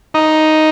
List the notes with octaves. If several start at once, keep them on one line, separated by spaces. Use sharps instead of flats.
D#4